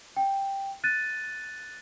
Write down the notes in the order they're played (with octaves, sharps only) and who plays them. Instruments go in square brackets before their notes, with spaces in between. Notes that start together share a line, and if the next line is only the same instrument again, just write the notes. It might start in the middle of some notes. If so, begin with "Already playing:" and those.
[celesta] G5
F#6 A6 D#7